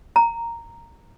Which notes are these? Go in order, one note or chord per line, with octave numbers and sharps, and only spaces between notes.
A#5